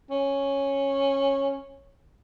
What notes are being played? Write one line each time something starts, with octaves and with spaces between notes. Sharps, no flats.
C#4